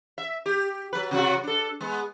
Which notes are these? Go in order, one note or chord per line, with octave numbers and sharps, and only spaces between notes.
E5
G4
F#3 B4
C3 F#3 F#4
D4 A4
G#3 B3